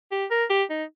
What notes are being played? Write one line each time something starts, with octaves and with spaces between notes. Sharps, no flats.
G4
A#4
G4
D#4